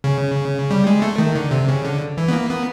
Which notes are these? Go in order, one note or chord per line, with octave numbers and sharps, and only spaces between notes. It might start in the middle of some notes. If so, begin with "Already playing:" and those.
C#3
G3
G#3
A3
D#3
D3
C3
C#3
D3
E3
B3
A#3
B3